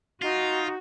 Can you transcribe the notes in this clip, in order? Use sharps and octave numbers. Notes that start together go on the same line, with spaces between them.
D#4 F4 F#4